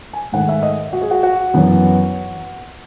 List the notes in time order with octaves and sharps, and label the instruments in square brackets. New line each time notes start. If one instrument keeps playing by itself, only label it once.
[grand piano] G#5
G#2 D#3 A3 F#5
E5
D#5
F#4
G#4
F#4
F#4
F#2 E3 B3